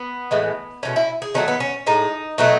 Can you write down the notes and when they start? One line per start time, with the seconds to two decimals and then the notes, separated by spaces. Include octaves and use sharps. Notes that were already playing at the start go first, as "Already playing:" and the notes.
Already playing: B3
0.31 A2 E3 G#3
0.83 B2 F#3 A3 C#4
0.96 E4
1.22 G#4
1.34 D#3 F#3 A3 C#4
1.48 B3
1.60 C#4
1.86 A2 G#3 D#4
2.38 B2 F#3 A3 D#4